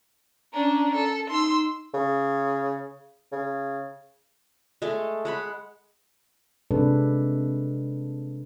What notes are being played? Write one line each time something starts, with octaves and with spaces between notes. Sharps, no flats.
C#4 D4 A#5
A4
D#4 C6 E6
C#3
C#3
G#3 A3 A4
G#3 F#5 B5
C3 G#3 D4 A4 B4